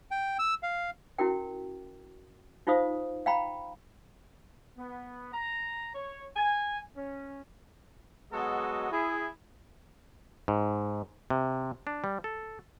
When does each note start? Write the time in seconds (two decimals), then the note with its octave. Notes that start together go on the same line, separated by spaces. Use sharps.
0.11 G5
0.39 E6
0.63 F5
1.18 C#4 E4 F#4 A#4 G5
2.67 D#4 F4 C5 F5 D#6
3.26 F5 G5 A#5 B5
4.77 B3
5.33 A#5
5.95 C#5
6.36 G#5
6.97 C#4
8.32 F#3 G#3 B3 F#4 A4 D#5
8.91 E4 G#4
10.48 G#2
11.30 C3
11.87 D4
12.04 G3
12.24 A4